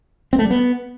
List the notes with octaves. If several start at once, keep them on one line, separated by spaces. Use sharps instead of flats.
C4
A3
G3
B3